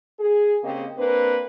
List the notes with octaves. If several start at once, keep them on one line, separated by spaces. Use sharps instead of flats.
G#4
C#3 A#3 C4 G4 D#5
A#3 C4 D4 B4